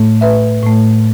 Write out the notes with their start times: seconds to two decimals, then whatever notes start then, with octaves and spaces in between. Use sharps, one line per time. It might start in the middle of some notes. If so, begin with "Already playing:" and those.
Already playing: A2 A3
0.21 B4 E5
0.63 A2 A3